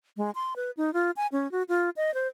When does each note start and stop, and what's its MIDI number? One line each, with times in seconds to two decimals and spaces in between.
0.17 0.31 56
0.35 0.54 84
0.56 0.71 71
0.77 0.93 63
0.93 1.11 65
1.17 1.27 80
1.32 1.50 61
1.52 1.63 66
1.69 1.90 65
1.96 2.13 75
2.14 2.27 72